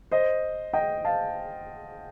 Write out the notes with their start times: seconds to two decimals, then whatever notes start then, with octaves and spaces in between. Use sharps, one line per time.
0.11 C5 D#5
0.73 D#5 G5
1.05 F5 A5